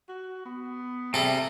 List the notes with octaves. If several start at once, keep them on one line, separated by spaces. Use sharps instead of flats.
F#4
B3
C3 G3 G#4 A4 E5